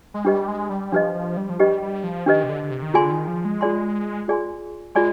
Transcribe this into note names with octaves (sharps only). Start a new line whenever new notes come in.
G#3
G3 D4 G4 B4 D#5
G#3
G3
F3 D4 G4 B4 D#5
F3
G3
F3
G3 D4 G4 B4 D#5
G3
F3
D#3 D4 G4 B4 D#5
C3
D3
D3
C3
D#3
D3 F4 G#4 D5 G#5 C6
D#3
F3
G#3
F4 G#4 D5 G#5 C6
F4 G#4 D5 G#5 C6
G#3 F4 G#4 D5 G#5 C6